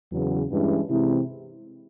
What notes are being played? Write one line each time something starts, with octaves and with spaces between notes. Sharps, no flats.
E2 C#3 F#3 B3
G2 E3 G#3 C#4 E4
C3 E3 G#3 C4 E4